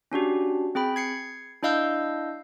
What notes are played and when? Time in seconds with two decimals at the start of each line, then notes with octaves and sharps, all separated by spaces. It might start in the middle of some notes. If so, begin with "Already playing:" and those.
0.12 C#4 D4 F#4 G4
0.75 C4 G#4 G5 B5
0.96 G#6 C7 C#7
1.63 D4 E4 D#5 F5 E6 G6